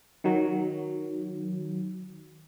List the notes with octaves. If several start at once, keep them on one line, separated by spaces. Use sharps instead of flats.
D#3 F#3